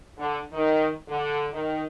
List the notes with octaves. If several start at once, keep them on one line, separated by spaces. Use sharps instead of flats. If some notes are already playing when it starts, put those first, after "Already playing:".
D3
D#3
D3
D#3